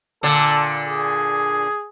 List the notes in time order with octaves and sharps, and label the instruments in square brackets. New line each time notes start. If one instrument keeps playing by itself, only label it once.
[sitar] A#2 D3 D4 [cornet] A4
[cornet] G#4